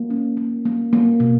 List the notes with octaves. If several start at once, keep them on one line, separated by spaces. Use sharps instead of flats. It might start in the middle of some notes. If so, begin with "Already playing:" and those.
Already playing: A#3
C#4
A#3
A#3
A#3
B2